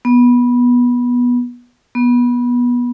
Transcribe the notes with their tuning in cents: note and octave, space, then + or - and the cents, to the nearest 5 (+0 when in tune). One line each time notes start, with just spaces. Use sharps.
B3 -15
B3 -20